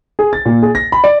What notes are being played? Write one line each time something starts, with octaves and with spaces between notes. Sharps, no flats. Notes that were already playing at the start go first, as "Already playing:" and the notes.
G#4
A6
A#2
G#4
A#6
B5
D5